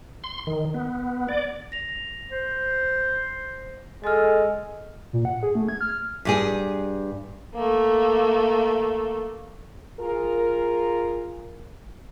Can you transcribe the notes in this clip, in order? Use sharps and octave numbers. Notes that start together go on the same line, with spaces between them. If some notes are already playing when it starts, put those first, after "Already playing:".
C6
D#3
B3
D5
A#6 F7
C5
G#3 A4 D#5 F6
A#2
F#5
G#4
A3
G#6
F6
G2 G3 G#4
A3 A#3
F4 G#4 A#4